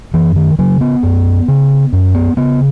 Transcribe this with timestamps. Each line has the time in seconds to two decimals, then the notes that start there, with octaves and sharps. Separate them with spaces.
0.14 F#2 E3
0.36 D#3
0.59 C#3 F#3
0.81 B3
1.03 F#2
1.48 C#3
1.93 F#2
2.15 B3
2.37 C#3 B3